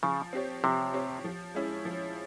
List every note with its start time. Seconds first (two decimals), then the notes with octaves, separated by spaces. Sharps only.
0.03 C#3 F3
0.33 C4 G4 C#5
0.63 C3 F3
0.94 C4 G4 C#5
1.24 F3
1.55 G#3 C#4 E4
1.85 F3